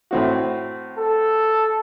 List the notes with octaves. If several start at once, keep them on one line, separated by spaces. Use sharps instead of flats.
A2 C4 F#4
A4